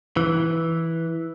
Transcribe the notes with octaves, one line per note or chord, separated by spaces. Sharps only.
E3